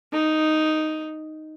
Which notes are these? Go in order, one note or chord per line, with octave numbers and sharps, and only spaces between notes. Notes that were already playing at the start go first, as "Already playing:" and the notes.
D#4